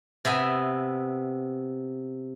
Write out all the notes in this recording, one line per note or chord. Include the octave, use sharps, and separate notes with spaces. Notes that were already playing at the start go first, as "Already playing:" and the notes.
C3 B3 E5 G#5